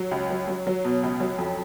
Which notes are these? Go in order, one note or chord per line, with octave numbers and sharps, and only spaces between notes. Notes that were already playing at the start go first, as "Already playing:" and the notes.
Already playing: F#3
C#2
F#3
F#3
F#3
B2
C#2
F#3
F2